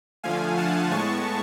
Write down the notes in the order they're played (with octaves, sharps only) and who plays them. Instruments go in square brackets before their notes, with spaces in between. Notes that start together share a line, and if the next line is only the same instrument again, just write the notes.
[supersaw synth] D3 F3 A3 F5 G#5
F#5 A5
A2 G#3 B3 A5 C#6